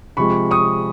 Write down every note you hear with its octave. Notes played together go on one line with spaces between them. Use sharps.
C3 F3 G#3 B5 C#6
C#6 D#6